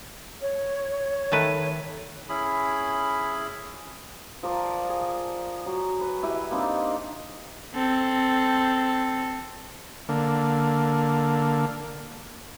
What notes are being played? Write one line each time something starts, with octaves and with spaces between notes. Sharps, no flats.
C#5
D#3 A3 B4
C#4 E4 G#4 B5
F3 A#4 D5
G#4
F#3
B4
E4 G4 E5
A#3 C4 D4 D#4
C4 A4
D3 A#3